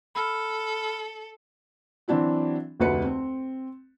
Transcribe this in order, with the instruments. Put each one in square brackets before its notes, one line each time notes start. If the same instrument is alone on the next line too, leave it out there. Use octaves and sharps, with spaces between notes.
[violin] A4 [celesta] B5 E6 F6
[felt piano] E3 F#3 C4 D4 E4 F#4
F1 D2 F#4 B4 C#7
C4